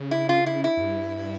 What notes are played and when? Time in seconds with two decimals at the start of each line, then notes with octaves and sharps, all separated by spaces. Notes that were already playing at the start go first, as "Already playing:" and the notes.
Already playing: C#3
0.11 E4
0.29 F4
0.46 E4
0.64 E4
0.77 F2
0.81 G2